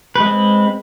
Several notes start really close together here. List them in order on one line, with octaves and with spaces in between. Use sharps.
B4 G#3 C4